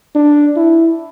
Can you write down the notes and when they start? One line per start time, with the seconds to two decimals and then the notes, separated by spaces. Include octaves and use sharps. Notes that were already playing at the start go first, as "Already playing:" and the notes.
0.15 D4
0.56 E4